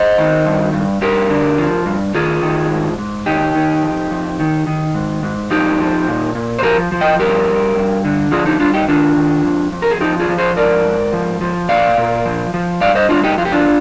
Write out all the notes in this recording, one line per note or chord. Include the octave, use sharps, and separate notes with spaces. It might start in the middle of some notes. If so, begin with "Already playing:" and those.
Already playing: C5 D#5
D#3
G2
G2
G2 G4 A#4
D3
F3
G2
D#3 F4 G#4
D#3
G#2
G#2
D#3 D#4 G4
D#3
F2
F2
D#3
D#3
G#2
G#2
F3 D#4 G4
F3
A#2
A#2
C5
F3 G4 A#4
F3
D#5 G5
G2 G4 A#4
G2
G2
D3
F3 F4 G#4
D#4 G4
G2 D4 F4
D#4 G4
D#3 D4 F4
D#3
F2
F2
A#4
G#4
F3 D#4 G4
F4 G#4
F3
G#4 C5
G#2 A#4 D5
G#2
F3
F3
A#2 D5 F5
A#2
F3
F3
G2 D5 F5
C5 D#5
G2 D4 F4
D#4 G4
F2 F4
G4
D4 F4